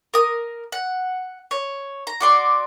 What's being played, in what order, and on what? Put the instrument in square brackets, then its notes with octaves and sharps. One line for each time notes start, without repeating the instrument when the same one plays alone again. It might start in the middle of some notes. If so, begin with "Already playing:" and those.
[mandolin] A#4 D#6
F#5
C#5
A#5
F#4 D5 C6